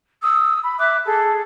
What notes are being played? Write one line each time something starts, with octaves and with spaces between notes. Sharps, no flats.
D#6 E6
B5
E5 D6 F#6
G#4 A4